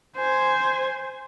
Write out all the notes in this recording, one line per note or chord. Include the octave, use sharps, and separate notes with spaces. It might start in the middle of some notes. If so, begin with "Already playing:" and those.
C5 G#5